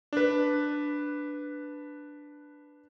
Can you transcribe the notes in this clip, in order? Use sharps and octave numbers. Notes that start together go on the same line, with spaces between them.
D4 B4